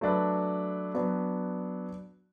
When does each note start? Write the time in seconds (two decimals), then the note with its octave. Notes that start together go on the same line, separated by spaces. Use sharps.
0.01 F#3 A3 D4 B4
0.94 F#3 B3 D4